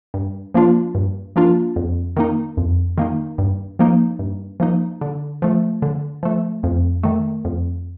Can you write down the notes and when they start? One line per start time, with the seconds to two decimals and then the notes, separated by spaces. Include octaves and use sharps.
0.14 G2
0.54 F3 A#3 D4 F4
0.95 G2
1.36 F3 A#3 D4 F4
1.76 F2
2.17 D#3 A#3 D#4
2.57 F2
2.98 D#3 A#3 D#4
3.38 G2
3.79 F3 A#3 D#4
4.19 G2
4.60 F3 A#3 D#4
5.01 D3
5.42 F3 A3
5.82 D3
6.23 F3 A3
6.63 F2
7.03 D#3 A3
7.45 F2